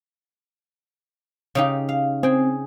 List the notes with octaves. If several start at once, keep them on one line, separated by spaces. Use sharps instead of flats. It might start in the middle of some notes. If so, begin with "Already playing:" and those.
C#3 D#4 G4
F5
C4 G#4 G5